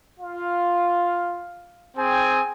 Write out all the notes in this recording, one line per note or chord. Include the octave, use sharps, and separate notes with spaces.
F4 F5
C4 G#4 C5 G5 G#5